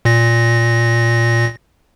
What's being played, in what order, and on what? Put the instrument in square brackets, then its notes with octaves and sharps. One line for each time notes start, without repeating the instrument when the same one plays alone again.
[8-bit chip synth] A#2 A#6